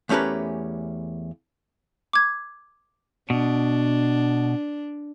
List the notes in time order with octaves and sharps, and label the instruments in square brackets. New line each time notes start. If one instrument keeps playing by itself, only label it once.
[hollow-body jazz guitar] E2 A3 C#4 G4 A#4 B4
[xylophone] D6 G#6
[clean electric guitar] B2 [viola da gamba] D4